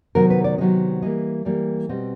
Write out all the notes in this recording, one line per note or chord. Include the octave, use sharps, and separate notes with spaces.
C3 D#3 F#3 B3 A#4
B4
D5
C3 D#3 F#3 B3 D#5
E3 G3 A#3 D#5
E3 G3 A#3 D5
B2 G3 C4 D#5